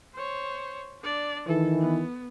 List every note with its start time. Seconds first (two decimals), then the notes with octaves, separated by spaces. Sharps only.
0.14 C5 C#5
1.02 D4 D5
1.47 D#3 E3 A4
1.79 B3